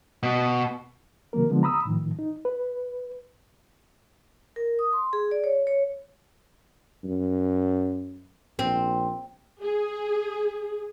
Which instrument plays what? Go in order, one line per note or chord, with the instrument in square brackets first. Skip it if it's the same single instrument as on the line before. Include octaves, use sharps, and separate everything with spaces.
[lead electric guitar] B2
[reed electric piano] C3 D#3 F#3 A#3 A#4
D3 F3 G#3 B3
A#5 B5 D#6 E6
A2 D#3 F3
D#4
B4
[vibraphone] A#4
D#6
C6
G#4
D5
C#5
C#5
[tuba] F#2
[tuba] A#1 [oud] C4
[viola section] G#4